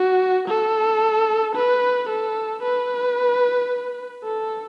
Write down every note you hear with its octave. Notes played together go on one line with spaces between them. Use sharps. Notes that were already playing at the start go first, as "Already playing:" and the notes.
Already playing: F#4
A4
B4
A4
B4
A4